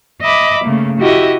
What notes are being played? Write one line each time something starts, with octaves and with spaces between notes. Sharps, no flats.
D#5 E5 B5 D6
C#3 A3 A#3
E4 F#4 G4 D#5 E5